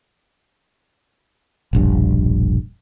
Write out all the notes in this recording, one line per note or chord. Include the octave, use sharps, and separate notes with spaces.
E1 A#1 G2